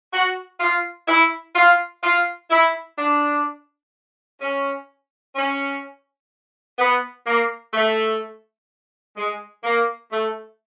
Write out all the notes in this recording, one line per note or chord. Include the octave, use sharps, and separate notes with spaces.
F#4
F4
E4
F4
F4
E4
D4
C#4
C#4
B3
A#3
A3
G#3
A#3
A3